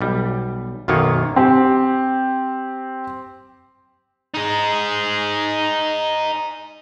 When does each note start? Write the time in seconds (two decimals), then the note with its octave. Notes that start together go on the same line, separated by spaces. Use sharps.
0.01 B1 G3
0.88 B1 F#2 D#3 A#3 F4 C#5
1.36 C4 G4
4.34 D#4 G#4